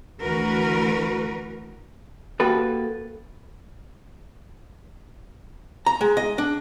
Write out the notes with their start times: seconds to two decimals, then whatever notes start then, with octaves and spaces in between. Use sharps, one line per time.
0.22 D2 E3 F#4 A#4 B4
2.40 A#3 F#4 G4 A4 B4
5.86 A#5
6.01 G#3
6.17 D#5
6.38 D4